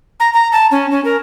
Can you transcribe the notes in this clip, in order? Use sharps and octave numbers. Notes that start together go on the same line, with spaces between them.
A#5
A#5
A5
C#4
C#4
A#4